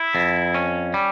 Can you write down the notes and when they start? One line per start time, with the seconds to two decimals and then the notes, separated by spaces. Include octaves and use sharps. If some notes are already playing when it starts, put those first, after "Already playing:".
Already playing: E4
0.15 F2
0.54 C#4
0.94 G3